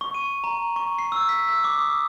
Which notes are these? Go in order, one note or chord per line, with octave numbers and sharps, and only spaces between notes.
C#6
D#7
A#5
C#6
C7
E6
B6
E6
D6
D#6